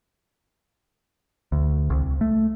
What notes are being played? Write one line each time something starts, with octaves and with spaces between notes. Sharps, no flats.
D2
C2
A3